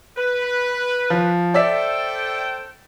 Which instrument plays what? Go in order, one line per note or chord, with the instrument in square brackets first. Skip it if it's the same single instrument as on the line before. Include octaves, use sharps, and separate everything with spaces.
[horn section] B4
[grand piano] F3
[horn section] A4 C5 G5 [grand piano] D5 E5 B6